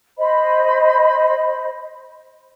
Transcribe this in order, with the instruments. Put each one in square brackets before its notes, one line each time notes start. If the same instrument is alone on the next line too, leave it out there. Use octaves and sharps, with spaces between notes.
[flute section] C5 D#5 B5